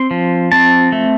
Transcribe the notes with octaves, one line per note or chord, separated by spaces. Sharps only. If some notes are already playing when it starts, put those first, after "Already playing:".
Already playing: C4 C6
F3
C4 A5
A3